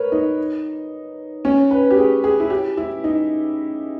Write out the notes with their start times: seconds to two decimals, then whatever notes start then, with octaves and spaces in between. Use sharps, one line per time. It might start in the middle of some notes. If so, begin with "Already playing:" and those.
Already playing: A#4 B4 C#5
0.12 D#4
1.45 C#4
1.71 B4
1.91 G4
1.97 G#4
2.24 G#4
2.40 E4
2.50 G4
2.77 E4
3.04 D#4